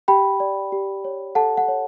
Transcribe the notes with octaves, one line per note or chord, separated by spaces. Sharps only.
G4 G5 B5
D5
G4
C#5
A4 F#5 A5
F#5
C#5